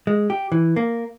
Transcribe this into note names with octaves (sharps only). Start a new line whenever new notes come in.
G#3
G4
E3
A#3